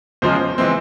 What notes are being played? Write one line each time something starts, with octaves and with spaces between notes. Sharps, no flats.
E2 C#3 F3 G#3 C5
E3 G#3 C4